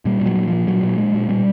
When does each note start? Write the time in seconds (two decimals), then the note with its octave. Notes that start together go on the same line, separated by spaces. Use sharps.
0.05 A#2 G3
0.21 A#2
0.26 F#3
0.37 A#2
0.48 F3
0.53 A#2
0.67 A#2 F#3
0.83 A#2
0.98 A#2 G#3
1.14 A#2
1.29 A#2 G3